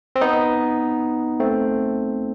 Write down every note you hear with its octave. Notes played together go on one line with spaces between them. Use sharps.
C4
B3 D#4
A3 C4